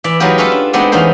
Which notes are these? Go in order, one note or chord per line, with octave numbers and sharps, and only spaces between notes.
E3 D5 E5
F#3 G#3 D#4 F4 G4 B4
C#4 F4 A4 B4 E5 A5
D4
G#3 B3 C4 D4 D#4 A4
E3 F3 B3 C#4 D#4 C5